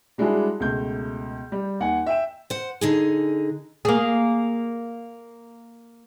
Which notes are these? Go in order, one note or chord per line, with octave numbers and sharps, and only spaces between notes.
G3 G#3 D4 E4 F#4 G#4
C#2 B2 A3 G6
G3
D#2 F#5 G#5
E5 G5 E7
C5 F#5
D3 D#4 G#4
A#3 G#4